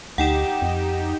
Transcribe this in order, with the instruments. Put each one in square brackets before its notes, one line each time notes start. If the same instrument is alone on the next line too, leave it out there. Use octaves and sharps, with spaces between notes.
[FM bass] D2 [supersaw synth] D#4 G4 [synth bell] F#5 G5 E7
[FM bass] F2